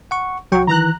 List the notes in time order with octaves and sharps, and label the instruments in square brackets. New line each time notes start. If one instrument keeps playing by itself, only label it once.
[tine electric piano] F#5 C#6
[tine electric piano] C2 G5 C#6 [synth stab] F#3
[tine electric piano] D#3 E3 [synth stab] A#5 F#6